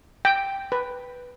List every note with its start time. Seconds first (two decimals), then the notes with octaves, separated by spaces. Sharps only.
0.25 G5
0.72 B4